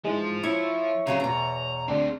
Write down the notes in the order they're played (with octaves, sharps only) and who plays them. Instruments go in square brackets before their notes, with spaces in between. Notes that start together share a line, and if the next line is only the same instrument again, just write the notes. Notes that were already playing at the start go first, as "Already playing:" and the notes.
[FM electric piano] G#2 E3 G#3 [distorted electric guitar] F3
[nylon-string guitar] E4 [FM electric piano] C#5 E5 C#6
[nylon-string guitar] C#3 F3 F#3 [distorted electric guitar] D4 A#5
[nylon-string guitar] E2 B2 [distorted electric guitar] A#5
[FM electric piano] D2 D4 [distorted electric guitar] C4 G#4